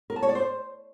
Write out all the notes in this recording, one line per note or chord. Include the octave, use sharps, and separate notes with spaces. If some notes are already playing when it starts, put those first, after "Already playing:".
A#4
A5
C#5
D5
C5